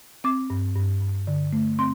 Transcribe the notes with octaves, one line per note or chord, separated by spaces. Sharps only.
C4 D6
G2
G2
G2
D3
A3
C4 C6